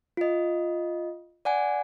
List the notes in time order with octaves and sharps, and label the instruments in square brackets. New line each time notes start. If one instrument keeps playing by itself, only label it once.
[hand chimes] F4 D#5
D5 F#5 G#5